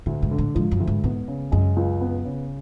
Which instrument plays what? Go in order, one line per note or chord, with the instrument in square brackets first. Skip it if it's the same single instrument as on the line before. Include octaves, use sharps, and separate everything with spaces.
[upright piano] D2 [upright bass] A2
[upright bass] G#2
[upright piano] D3
[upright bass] A2
[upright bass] G#2 [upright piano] F3
[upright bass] F#2
[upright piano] D2
[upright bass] G#2
[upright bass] G#2 [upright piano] B3
[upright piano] C#3
[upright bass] F#2 [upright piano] G#3
[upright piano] C#2
B3
C#3